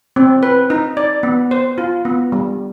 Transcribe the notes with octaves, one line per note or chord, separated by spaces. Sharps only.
C4
B4
D#4
D5
B3
C5
F4
B3
G3